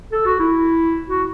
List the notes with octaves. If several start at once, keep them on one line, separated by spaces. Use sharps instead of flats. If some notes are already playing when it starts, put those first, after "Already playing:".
A4
F#4
E4
F#4